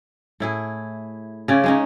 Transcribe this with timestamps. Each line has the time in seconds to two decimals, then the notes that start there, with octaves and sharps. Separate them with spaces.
0.40 A2 E4 G#4
1.48 C#3 C#4 D5
1.64 G#3 C#4 D#4